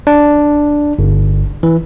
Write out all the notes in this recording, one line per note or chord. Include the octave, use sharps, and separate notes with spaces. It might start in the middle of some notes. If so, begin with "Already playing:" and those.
D4
G1
E3